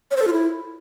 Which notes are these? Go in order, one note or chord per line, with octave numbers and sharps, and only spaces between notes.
C#5
C5
A4
F4
E4